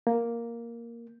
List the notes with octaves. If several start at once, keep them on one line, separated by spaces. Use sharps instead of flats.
A#3